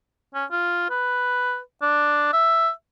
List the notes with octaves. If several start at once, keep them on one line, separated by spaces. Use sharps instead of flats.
C#4
F4
B4
D4
E5